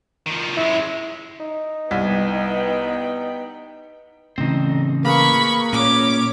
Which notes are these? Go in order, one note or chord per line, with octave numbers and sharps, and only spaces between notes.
D#3 F3
F#2 G#3 E4
D#4
C2 B3 G5
A2 C#3 E3 C4 D#4
A#3 G#4 A#4 B4 F5 B5 C#6
A#2 A#3 C#4 C#5 D6